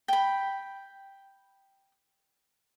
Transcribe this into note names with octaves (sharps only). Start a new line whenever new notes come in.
G5 B5